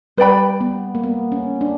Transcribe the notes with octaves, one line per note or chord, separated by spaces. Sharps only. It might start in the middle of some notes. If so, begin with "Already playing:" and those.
G3 B4 D5 G5 B5
B3
A#3
B3
C#4
D4